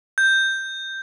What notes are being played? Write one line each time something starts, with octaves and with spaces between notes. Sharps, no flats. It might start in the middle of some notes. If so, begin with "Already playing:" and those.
G6